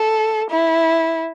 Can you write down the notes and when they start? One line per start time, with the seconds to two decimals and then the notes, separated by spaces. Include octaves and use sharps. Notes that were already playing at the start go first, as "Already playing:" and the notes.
Already playing: A4
0.50 E4